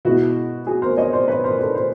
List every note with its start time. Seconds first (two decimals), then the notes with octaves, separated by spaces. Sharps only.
0.05 B2 G#3 B3 E4 F#4
0.67 F#4 G#4
0.82 A#4 C5
0.97 C#5 D#5
1.13 C5 D5
1.28 B4 C#5
1.44 A#4 C5
1.59 A4 B4
1.74 A#4 C5